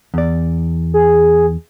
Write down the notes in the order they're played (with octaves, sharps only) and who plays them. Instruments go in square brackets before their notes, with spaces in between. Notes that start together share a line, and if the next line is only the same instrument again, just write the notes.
[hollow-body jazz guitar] E2 D5
[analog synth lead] G#4